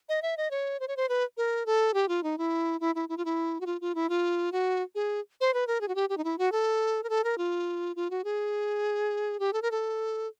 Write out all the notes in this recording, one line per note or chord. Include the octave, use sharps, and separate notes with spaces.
D#5
E5
D#5
C#5
C5
C#5
C5
B4
A#4
A4
G4
F4
D#4
E4
E4
E4
E4
F4
E4
F#4
F4
F4
E4
F4
F#4
G#4
C5
B4
A#4
G#4
F#4
G4
G4
D#4
E4
F#4
A4
A#4
A4
A#4
F4
F4
F#4
G#4
G4
A4
A#4
A4